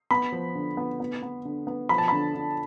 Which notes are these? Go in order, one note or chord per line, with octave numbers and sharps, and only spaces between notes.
B3 B5
F3
D3
B3
B3
B3
D3
B3
F3 B5
A5
D3 B5
D3